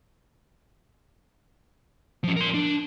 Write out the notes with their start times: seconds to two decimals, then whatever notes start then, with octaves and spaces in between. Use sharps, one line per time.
2.24 F3 C#4
2.37 A#4 C6
2.54 D4